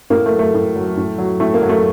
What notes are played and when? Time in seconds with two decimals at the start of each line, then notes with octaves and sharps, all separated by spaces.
0.10 A2 A#3
0.26 A3
0.32 F#3
0.39 A3
0.54 A2
0.76 F#3
0.97 A2
1.18 F#3
1.40 A2 A3
1.54 A#3
1.62 F#3
1.69 A3